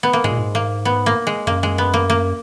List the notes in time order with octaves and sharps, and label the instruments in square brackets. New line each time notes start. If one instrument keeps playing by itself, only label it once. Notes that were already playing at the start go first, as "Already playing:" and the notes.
[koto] B3
A#3
[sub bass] G#2 [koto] G#3
[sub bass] A#2
G#2
[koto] A#3
B3
A#3
G#3
[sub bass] F#2 [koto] A#3
[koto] G#3
B3
A#3
A#3